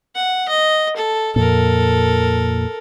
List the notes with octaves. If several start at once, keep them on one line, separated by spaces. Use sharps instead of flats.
F#5
D#5
A4
F2 A#2 A4 A#4